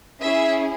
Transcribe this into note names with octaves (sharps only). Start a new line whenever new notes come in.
C#4 E4 G#4 E5